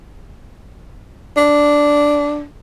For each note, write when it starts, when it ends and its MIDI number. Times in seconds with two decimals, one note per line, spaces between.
1.37 2.44 62